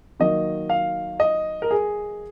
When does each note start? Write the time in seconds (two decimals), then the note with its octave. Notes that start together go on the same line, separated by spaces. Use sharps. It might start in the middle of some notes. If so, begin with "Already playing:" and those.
0.20 D#3 F#3 A#3 D#5
0.69 F5
1.20 D#5
1.62 A#4
1.71 G#4